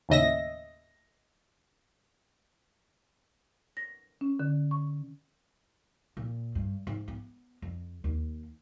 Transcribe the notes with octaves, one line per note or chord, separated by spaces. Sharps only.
D#2 A2 C#3 D#5 E5 A#6
A#6
C#4
D3
C#6
A#2
G2
G#2
B3
F2
D#2